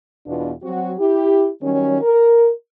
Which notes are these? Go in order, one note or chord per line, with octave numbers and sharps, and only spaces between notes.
E2 B2 D4 F4
F#3 C4 F#4
E4 G4
D#3 F#3 G3 C#4
A#4